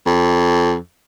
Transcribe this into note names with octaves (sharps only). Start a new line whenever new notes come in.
F2